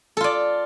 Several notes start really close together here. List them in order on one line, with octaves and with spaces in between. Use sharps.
A4 F4 D5